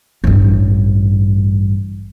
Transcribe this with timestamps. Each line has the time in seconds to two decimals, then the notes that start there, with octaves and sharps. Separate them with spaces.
0.24 A1 G2